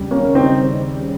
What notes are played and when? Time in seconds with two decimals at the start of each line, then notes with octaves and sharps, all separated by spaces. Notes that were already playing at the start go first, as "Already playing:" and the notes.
Already playing: D#2 C#3 G3
0.11 A#3 C#4
0.35 C4 D#4